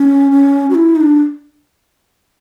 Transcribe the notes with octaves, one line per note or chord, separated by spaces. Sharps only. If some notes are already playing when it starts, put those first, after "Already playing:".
Already playing: C#4
C#4
F#4
E4
D#4
D4